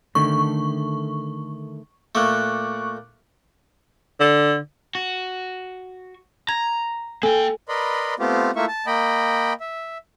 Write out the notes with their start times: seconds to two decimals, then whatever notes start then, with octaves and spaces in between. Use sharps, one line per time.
0.15 D3 D#3 A3 C#6
2.15 A#2 A3 C#6 D6 F#6
4.20 D3
4.95 F#4
6.49 A#5 G#6
7.23 A#3 A4 G5 G#5
7.68 A#4 B4 D5 D#5 B5 C6
8.19 A3 B3 C4 F4 G4
8.56 A3 A#3 E4 F4 E5 C#6
8.68 A5
8.87 A#3 D#5 G5 B5
9.60 E5